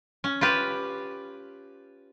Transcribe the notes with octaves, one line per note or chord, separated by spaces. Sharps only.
C#4
F4 G4 B4